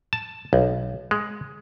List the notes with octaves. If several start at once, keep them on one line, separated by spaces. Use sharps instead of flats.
A5
B1
G#3